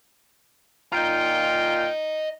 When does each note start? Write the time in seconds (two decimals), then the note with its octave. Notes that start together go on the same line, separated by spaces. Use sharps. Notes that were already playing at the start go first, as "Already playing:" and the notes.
0.92 A#2 F4 D#5 G5 A#5